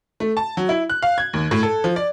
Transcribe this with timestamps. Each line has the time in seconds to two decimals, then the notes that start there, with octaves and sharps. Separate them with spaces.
0.20 A3
0.37 A5
0.57 F#3
0.69 E4
0.90 F#6
1.02 F5
1.18 G#6
1.33 D#2
1.51 A2
1.63 A4
1.84 F3
1.96 D5